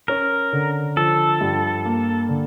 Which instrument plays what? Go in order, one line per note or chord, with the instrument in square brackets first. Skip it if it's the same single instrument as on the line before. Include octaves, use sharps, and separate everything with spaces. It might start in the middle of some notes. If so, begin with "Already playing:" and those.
[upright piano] C#4 [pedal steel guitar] A#4
[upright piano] D3
[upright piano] F3 [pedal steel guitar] A4
[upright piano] G2
A#3
D3